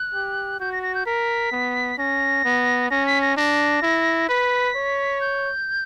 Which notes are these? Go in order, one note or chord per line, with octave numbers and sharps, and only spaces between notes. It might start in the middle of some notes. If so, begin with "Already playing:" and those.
Already playing: F#6
G4
F#4 G6
A#6
A#6
G6
A#4 B6
B3
C#4 A#6
B3
C#4 A#6
B6
A#6
D4 A#6
E4
B4 B6
C#5
G6